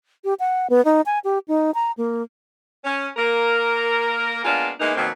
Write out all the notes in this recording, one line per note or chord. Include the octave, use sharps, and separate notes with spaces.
G4
F#5
B3
D#4
G#5
G4
D#4
A#5
A#3
C#4
A#3 A#4
G#3 A#3 B3 D4 F4
E3 G#3 A#3 B3 D#4
F2 B2 D#3 F#3 A#3 C4